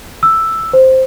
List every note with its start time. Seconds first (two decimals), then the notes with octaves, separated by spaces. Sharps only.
0.23 E6
0.73 C5